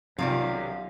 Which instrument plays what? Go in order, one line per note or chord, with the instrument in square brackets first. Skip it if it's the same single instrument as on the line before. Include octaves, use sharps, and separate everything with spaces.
[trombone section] B1 F4 [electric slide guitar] F#2 [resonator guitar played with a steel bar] C3 D#3 G3 [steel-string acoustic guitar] F5